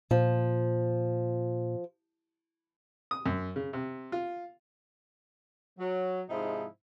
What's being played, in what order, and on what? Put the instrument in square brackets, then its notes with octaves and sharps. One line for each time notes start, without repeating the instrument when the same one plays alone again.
[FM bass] A#2 [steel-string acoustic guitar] F3
[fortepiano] D#6
F#2
C#3
C3
F4
[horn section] F#3
G#2 C3 F3 G#3 D#4 E4